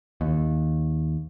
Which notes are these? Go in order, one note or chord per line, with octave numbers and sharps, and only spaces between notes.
D#2